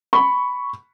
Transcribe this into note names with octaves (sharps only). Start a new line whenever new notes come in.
B5 C#6